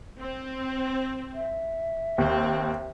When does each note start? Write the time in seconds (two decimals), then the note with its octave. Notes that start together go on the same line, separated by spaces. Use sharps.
0.19 C4
1.35 E5
2.18 D#2 C4